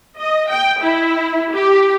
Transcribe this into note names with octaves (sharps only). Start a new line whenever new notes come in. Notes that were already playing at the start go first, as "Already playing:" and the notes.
D#5
G5
E4
G4